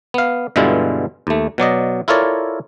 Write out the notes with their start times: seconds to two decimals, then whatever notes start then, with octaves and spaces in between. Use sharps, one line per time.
0.14 B3 F5
0.56 G2 B2 D3 G#3 E4 F4
1.27 D#2 A3
1.58 B2 F#3 D5 D#5
2.08 E4 F4 A4 A#4 C#5 D5